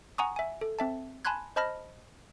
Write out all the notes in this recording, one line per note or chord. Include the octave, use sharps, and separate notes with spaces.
F#5 G#5 A#5 C#6 D#6
E5 G#5
A4
C4 E5 A5
G#5 A5 B5 C6 F#6 G#6
C5 D#5 A5 B5 F6 A#6